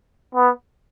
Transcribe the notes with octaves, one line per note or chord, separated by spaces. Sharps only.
B3